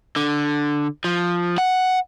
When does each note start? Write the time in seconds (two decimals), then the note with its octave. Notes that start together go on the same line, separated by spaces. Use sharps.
0.16 D3
1.04 F3
1.58 F#5